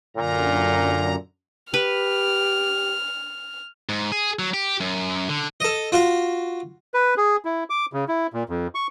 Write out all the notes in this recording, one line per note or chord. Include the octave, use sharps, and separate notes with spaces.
F#2 A#2 D3 A#5
G4 B4 F6
G#2
G#4
F#3
G4
F#2
D3
A4 D#5
F4 F#4 F5
B4
G#4
E4
D6
C#3
E4
A#2
F2
C#6